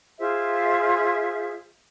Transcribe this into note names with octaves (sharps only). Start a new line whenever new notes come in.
F4 G#4 C5 E5